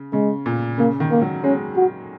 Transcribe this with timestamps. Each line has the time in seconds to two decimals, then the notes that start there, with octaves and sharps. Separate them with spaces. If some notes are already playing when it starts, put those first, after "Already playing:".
Already playing: C#3
0.13 C#3 G#3
0.46 A#2
0.78 C#3 A#3
1.00 D#3
1.11 A#3
1.22 F#3
1.44 G#3 C#4
1.76 F#4